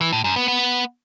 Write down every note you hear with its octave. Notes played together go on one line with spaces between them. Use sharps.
E3
A2
F#2
B3
B3